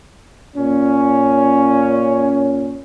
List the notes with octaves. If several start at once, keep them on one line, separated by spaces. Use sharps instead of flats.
A#2 C#4